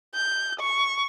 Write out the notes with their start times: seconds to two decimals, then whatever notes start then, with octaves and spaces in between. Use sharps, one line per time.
0.14 G6
0.60 C#6